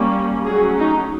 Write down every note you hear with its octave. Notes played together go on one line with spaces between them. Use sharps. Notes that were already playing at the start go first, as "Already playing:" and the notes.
Already playing: G3 A#3 C#4
F#3 A3 C#4 G#4
D#4